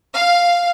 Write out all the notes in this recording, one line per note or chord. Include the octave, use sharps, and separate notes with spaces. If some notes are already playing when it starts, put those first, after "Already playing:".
F5